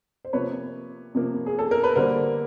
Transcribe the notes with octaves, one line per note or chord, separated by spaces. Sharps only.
C5
C3 F3 A#3 B4 C#5
C3 F3 A#3
G#4
A4
A#4
B4
D3 G3 A#3 A#4 C5